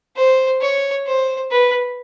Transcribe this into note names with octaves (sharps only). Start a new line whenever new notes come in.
C5
C#5
C5
B4